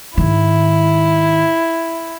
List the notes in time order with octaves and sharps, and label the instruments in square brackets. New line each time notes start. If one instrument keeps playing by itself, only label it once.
[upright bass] G#2 D#3 [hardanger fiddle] E4